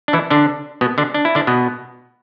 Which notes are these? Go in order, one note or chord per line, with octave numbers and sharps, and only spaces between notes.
D4
E3 E4
D3 D4
B2 B3
D3 D4
D4
E4
D3 D4
B2 B3